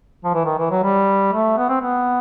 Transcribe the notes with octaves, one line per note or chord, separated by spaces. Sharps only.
F3
E3
D#3
E3
F#3
G3
A3
B3
C4
B3